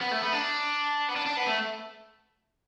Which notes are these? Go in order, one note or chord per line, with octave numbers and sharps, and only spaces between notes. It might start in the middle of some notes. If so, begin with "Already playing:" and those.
B3
A3
B3
D4
B3
D4
D4
B3
A3